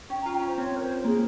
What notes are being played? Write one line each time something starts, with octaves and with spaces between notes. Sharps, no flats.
C#4 G5
A#5
F4
G5
C#4 C5
C4 C#5
A#4
C5
A#3 G#4